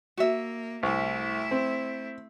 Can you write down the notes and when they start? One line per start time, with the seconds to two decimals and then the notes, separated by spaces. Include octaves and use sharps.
0.17 A#3 F#4 E5
0.83 C2 A3 E4
1.51 C4